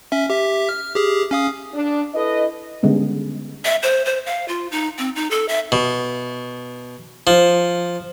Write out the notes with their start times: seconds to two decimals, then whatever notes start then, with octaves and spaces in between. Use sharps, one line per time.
0.12 C#4 E5
0.30 G4 E5
0.69 F6
0.94 G4 G#4
1.31 C#4 F5 D#6
1.73 D4
2.14 E4 A4 B4 D#5
2.83 D3 G3 G#3 B3 C#4
3.65 E5
3.83 C5
4.05 C5
4.26 F5
4.48 F4
4.71 D#4
4.98 C4
5.16 D#4
5.31 A4
5.48 E5
5.72 B2
7.27 F3